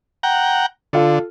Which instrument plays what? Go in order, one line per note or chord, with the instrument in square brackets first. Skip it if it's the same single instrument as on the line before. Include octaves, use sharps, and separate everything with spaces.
[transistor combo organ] F#5 G5 A#5
[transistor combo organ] D3 [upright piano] F4 A4